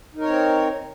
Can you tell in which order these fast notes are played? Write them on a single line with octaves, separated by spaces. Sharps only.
D#4 A#4 C#5 C4